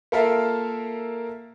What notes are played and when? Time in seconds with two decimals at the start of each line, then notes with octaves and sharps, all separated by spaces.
0.12 A#3 F4 A4 A#4 E5 F5